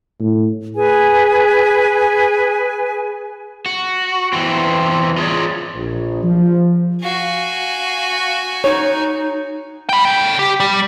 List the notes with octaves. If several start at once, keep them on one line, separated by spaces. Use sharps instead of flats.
A2
G#4 B4 G#5
F#4
E2 E3 C4
F4 G#4 B4 C#5 D5
A#1
F3
F#4 F5 G#5
D#4 C#5
G5 B5
C#3 G5
G4
G3